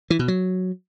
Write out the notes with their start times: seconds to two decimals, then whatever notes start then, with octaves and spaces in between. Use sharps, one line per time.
0.10 E3
0.19 B2
0.28 F#3